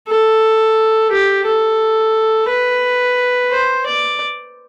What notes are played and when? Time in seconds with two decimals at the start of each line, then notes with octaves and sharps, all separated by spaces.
0.08 A4
1.12 G4
1.46 A4
2.49 B4
3.52 C5
3.86 D5